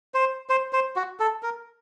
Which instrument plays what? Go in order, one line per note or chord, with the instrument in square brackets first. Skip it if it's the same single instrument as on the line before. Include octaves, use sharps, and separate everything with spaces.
[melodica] C5
C5
C5
F#4
A4
A#4